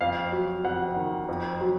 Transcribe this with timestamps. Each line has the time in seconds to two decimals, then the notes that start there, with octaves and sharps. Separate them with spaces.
0.01 F2 F5
0.32 F#3
0.64 F2 F#5
0.96 D#3
1.29 F2
1.61 F#3